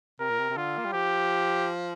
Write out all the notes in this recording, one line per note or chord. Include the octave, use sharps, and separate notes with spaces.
C3 A#4
A#2
C3
C3
D3 F4
A#3
G3
F3 G4